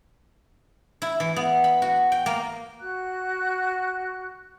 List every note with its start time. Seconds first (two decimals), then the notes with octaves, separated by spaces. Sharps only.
1.02 E4
1.20 E3
1.36 B3
1.64 B5
1.82 F#4
2.12 G5
2.26 A#3
2.80 F#4 F#6